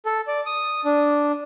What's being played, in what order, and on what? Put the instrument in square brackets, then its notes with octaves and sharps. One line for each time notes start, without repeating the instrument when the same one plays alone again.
[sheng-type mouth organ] A4
D5
D#6
D4